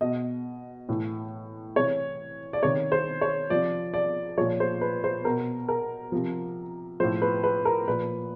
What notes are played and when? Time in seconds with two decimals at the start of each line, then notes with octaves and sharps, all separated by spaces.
0.01 B2 D#5
0.89 A2 E3
1.76 C3 E3 C#5
2.53 D5
2.63 C3 D#3 C#5
2.92 C5
3.21 C#5
3.50 C3 F3 D5
3.94 D5
4.38 A#2 F3 C#5
4.60 C5
4.81 B4
5.04 C5
5.25 B2 A#4
5.68 A#4
6.12 C3 F3
7.00 A2 F3 C5
7.22 B4
7.44 B4
7.65 A#4
7.88 A#2 F3 B4